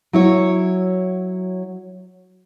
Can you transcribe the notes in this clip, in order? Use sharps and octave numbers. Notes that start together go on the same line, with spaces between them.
F#3 E4 C#5